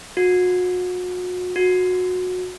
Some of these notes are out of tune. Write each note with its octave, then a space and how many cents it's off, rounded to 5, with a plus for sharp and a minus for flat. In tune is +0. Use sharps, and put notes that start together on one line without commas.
F#4 -35
F#4 -20